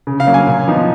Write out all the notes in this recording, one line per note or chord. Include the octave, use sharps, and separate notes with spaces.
C#3
F5
F#3 A#3 C#4
G#5
A#2
F3 B3 D#4